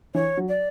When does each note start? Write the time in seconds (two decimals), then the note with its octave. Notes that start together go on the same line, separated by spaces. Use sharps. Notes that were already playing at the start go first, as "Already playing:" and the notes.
0.15 E3 C#5
0.37 F#3
0.48 D5